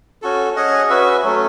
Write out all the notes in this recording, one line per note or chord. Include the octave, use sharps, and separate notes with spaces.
C#4 F#4 A4
C#4 G#4 D#5 F#5
C#4 F#4 B4 E5
F#3 A3 C#4